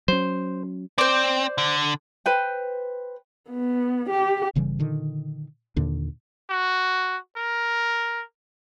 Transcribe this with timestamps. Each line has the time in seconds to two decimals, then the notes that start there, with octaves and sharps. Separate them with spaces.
0.08 F#3 C#4 C5
0.98 C4 C5 D5
1.58 D3
2.26 B4 C5 G5
3.50 B3
4.10 G4
4.55 G1 C#3 E3 G3
4.79 A#2 D3 D#3
5.76 D#2 A#2 D3 D4
6.50 F#4
7.36 A#4